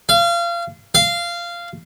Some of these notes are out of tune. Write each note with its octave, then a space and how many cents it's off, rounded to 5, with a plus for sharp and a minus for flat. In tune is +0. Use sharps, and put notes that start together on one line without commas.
F5 -30
F5 -15